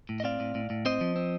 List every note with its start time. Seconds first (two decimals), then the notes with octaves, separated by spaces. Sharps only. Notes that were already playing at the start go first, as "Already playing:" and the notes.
0.09 A2
0.20 D#5
0.24 C4 D5 F5
0.40 A2
0.55 A2
0.70 A2
0.85 C4 C5 D#5
1.01 F3
1.16 C4